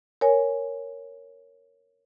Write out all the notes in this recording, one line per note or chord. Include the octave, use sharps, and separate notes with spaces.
A#4 C#5 G#5